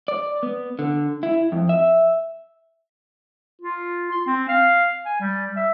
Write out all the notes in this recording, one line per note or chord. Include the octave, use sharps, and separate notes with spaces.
D5
B3
D3
E4
F2
E5
F4
C6
C4
F5
G#5
G3
E5